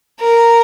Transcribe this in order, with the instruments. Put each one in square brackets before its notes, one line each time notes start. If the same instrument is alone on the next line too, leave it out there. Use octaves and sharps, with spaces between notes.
[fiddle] A#4